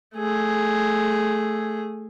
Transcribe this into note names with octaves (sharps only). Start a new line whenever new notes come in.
A3 G#4